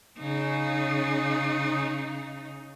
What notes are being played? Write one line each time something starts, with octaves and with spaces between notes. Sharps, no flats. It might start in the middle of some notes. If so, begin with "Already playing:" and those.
C#3 D#4